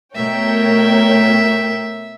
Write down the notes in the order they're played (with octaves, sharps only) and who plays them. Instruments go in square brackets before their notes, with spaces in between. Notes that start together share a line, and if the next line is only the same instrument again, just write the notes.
[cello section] B2 A3 [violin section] A#4 C#5 G5 [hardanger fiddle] E5